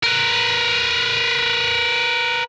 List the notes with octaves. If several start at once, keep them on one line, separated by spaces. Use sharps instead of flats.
A#4 B4